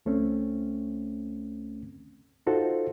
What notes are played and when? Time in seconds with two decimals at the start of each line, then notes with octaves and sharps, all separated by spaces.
0.06 C#2 A3 C4 C#4
2.47 D#4 F4 F#4 A4 C5